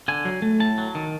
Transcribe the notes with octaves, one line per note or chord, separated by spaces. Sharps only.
D3 G#5
F#3
A3
A2 A5
F#3
D#3